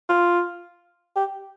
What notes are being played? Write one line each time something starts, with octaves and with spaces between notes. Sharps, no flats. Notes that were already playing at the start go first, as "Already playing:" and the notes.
F4
G4